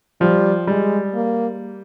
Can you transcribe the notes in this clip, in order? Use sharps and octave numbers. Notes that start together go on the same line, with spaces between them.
F3 G3
G3 G#3
A#3